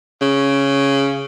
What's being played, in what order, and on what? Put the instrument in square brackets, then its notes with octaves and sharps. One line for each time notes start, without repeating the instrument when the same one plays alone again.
[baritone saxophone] C#3